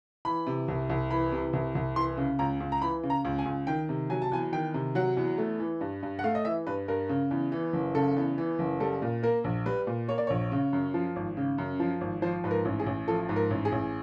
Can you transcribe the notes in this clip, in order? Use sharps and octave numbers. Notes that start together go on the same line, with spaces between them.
E3 B5
C3
C2
C2
E3 B5
C3
C2
C2
E3 C6
C#3
C#2 A#5
C#2
A#5
E3 B5
C#3
A#5
C#2
G#5
C#2
D#3 G5
C3
F#3 G#5
A5
E2 G#5
D#3 G5
C3
F#3 F#5
E2
A3
E3
G2
G2
F#5
A3 F5
D#5
E3 E5
G2 B4
G2 A#4
C#3
E2
E3
F#1
C#3 A4
E2
E3
F#1
G3 A4
A#2
A#3 A#4
A#1
G3 B4
A#2
A#3 C#5
D5
A#1 C#5
C#3
F#2
F3
G#1
C#3
F#2
F3
G#1
F3 C5
G#2 B4
A#4
A1
G#4
A1
F3 A4
G#2
A#4
A1
G#4
A1